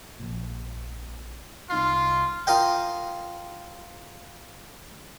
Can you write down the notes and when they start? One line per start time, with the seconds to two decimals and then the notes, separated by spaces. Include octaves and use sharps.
0.20 A#1 A#2
1.70 C2 D#4 F4 C7
2.47 F4 A#4 D#5 G5